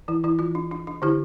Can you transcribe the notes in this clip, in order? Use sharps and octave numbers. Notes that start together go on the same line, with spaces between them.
E3 E4
E3 E4
E3 F4
D4
D4
D4
D3 E4 G4